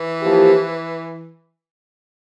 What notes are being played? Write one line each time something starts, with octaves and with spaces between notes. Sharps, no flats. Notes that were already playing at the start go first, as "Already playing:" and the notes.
Already playing: E3
F3 A#3 E4 G4